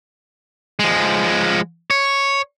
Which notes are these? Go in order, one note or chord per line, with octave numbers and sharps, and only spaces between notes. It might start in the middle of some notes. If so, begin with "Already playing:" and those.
F3 G#3
C#5